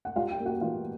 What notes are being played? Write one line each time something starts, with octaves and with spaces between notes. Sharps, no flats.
F#5
G3 F4 F5
G4 G5
A#3
F#4 F#5
E3 F4 F5